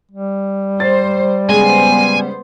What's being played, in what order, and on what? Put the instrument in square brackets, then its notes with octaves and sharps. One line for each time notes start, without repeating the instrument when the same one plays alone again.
[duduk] G3
[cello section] C5 [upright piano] A6
[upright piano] C#3 G#3 [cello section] B3 C5 [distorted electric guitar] G#5